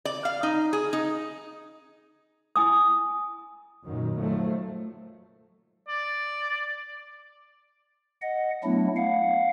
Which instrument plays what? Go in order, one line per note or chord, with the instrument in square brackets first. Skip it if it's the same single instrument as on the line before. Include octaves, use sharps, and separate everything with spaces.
[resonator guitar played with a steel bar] D5
F5
D#4
G#4
D#4
[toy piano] E4 G#5 D#6
[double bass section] F#2 A#2 D#3
D#3 F3 F#3 A3
[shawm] D5
[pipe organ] D#5 F#5
F#3 A3 B3 D4 E4
F5 F#5